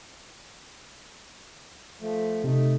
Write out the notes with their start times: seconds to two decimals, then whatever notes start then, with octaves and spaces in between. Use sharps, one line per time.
2.01 F3 A3
2.44 C3 A3 D#4